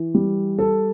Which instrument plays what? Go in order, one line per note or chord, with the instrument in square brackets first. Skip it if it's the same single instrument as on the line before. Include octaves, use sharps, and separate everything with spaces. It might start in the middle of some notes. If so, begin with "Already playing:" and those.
Already playing: [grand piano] E3
G3
A4